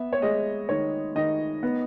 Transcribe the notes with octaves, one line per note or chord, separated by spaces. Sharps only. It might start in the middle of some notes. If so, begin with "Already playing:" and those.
Already playing: B3 E5
C#5
G#3 D#5
D#3 C#5
D#3 D#5
B3